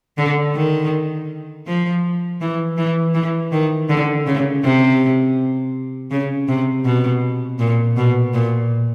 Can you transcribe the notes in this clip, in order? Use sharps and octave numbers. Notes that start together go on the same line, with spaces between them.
D3
D#3
F3
E3
E3
E3
D#3
D3
C#3
C3
C#3
C3
B2
A#2
B2
A#2